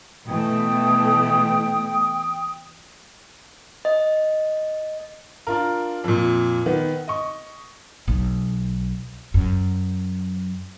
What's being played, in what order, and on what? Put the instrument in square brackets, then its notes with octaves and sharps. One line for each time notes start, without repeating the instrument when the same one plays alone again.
[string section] B2 E3 A3 [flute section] G5 D#6
[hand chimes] D#5
[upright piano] D4 F4 A#4
F2 A#2
D#3 B3
D#5 C#6
[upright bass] B1
F#2